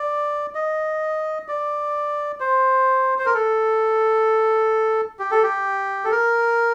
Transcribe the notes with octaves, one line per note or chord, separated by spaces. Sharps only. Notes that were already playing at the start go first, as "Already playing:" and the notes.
Already playing: D5
D#5
D5
C5
C5
A#4
A4
G4
A4
G4
A4
A#4